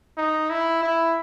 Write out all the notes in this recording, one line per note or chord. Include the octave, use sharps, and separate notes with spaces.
D#4
E4
E4